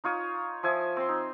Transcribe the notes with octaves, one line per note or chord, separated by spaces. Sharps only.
D#4 F4 C#5 D#6
F3 E5 G#5 D#6
C4 C6
D#4